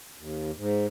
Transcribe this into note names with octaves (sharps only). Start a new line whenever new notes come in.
D#2
G#2